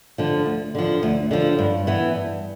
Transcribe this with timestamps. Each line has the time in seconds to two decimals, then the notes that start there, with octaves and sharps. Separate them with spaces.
0.18 D3 F3
0.46 D2
0.75 D3 F3
1.03 D2
1.31 D3 F3
1.59 G2
1.87 E3 B3
2.15 G2